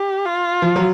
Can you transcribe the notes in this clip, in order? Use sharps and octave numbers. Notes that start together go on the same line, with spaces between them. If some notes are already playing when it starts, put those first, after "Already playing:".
Already playing: G4
F4
F3
F#3